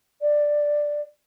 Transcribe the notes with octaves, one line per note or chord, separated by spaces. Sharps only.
D5